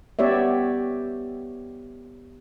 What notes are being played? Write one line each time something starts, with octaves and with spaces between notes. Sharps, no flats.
B3 G4 C#5 D5 E5